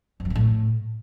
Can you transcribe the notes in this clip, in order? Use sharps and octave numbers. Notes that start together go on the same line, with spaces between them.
F2
F#3
A#2
A2